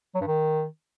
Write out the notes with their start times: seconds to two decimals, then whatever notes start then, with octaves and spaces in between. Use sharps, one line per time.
0.15 F#3
0.21 G2
0.27 D#3